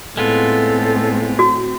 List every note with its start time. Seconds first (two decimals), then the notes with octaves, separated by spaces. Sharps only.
0.17 A2 G#3 B3 C4 F4 A4
1.39 F#4